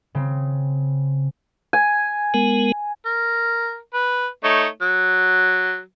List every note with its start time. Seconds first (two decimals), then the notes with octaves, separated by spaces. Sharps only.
0.15 C#3 C4
1.73 G#5
2.34 G#3 B3 A#4
3.06 A#4
3.94 B4
4.44 A3 D#4 C#5
4.82 F#3